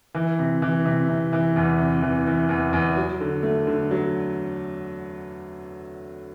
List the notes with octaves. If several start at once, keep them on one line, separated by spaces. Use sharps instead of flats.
E3
C3
E3
C3
C3
E3
E2
C3
E3
E3
E2
E2
F#3
D3
A3
D3
F#3